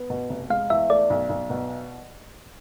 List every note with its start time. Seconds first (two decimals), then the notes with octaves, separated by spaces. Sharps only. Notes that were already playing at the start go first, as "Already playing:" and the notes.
Already playing: B3
0.10 B2
0.29 F1
0.50 G#3 F5
0.70 E2 E5
0.90 A3 D5
1.10 B1
1.29 B1
1.50 B2